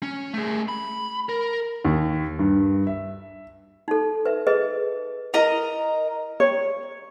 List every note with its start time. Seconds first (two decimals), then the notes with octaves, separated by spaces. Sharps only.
0.03 C#4
0.34 A3 G#4
0.68 B5
1.29 A#4
1.85 D#2
2.39 G2
2.87 E5
3.88 D#4 A4
4.26 B4 E5
4.47 G#4 B4 D#5
5.34 E4 A#4 D#5 F5 A#5
6.40 C#5